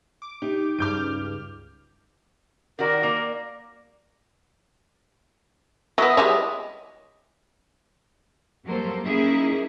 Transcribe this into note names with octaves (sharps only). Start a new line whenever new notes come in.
D6
D#4 G4
C#2 G2 D6 F6 G6 D7
D#3 F#4 A#4 D5
A#3 D5
F#3 B3 E4 D#5
G3 G#3 C#5
F2 F#3 G3 A#3 A4 C5
A#3 C#4 D#4 E4 G#4